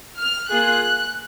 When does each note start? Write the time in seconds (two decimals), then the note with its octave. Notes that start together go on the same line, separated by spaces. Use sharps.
0.19 F6
0.49 A#3 F4 G#4 F#6